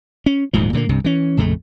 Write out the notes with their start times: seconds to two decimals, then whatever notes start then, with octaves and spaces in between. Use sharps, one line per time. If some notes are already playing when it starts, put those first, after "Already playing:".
0.26 C#4
0.53 D#1 D2 G#2 F3
0.73 A#2 D3 F3 A#3
0.89 C2 G2 C3
1.04 E3 C#4
1.37 A#1 F2 C#3 A3